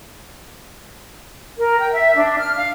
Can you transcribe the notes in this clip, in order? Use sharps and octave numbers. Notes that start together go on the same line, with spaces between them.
A#4
G5
E5
D4
F6
F5